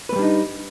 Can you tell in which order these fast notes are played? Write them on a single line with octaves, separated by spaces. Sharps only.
B4 A3 G3 D4 D#4